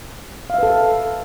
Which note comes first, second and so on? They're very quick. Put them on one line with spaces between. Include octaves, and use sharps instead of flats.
F5 E5 B4 A4